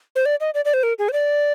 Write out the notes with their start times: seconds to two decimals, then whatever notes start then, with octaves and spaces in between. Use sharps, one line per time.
0.16 C5
0.26 D5
0.40 D#5
0.54 D5
0.65 D5
0.74 C5
0.83 A#4
0.99 G#4
1.09 C5
1.13 D5